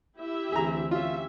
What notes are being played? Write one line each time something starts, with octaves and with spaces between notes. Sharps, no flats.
E4 G4 E5
D2 E3 C4 G#4 A#5
C#4 F4 G4 E5